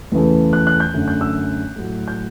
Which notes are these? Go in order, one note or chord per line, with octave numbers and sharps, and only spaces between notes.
E2 C#3 E3 A3
F#6
F#6
G6
F#2 D3 A3
G6
E6
A2 F#3 A3
G6